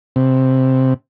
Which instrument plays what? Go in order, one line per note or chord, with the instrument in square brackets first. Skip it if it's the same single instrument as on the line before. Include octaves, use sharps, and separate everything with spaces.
[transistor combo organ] C3